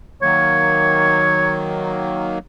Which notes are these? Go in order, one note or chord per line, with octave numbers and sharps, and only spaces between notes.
D#3 F#3 A#3 C#5